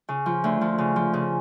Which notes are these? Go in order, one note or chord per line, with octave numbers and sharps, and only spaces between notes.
C#3
F3
D2
F3
C#3
F3
C#3